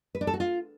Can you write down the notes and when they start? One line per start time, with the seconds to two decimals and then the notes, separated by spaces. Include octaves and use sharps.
0.15 B4
0.21 D4
0.27 A4
0.34 F#4
0.40 F4